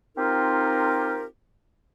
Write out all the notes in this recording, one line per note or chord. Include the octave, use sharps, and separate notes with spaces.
C4 D#4 F4 G4 A#4